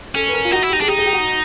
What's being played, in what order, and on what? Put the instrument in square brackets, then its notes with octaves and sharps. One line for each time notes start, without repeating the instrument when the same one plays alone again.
[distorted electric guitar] C#4 [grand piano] A4
[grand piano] B4
A#4
F4
[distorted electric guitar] D#4 [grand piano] F#4
[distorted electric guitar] E4
[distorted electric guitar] D#4 [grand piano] G4
[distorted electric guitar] D4 [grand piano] G#4
[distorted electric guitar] D#4 [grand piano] G4
[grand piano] G#4
G4
F#4